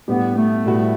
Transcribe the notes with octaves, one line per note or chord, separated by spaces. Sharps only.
A2 G3 B3 D4 G4
A3
A2 G3 B3 F#4